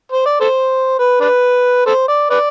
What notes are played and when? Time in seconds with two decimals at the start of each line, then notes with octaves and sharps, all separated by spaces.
0.12 C5
0.26 D5
0.40 A4 C5
0.99 B4
1.20 D4 B4
1.86 A4 C5
2.08 D5
2.30 B4 D5